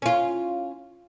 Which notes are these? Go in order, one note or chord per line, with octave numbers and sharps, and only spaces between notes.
C#4 F4